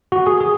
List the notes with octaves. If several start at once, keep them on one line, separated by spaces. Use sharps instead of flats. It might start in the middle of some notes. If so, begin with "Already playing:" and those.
F#4
G#4
G#4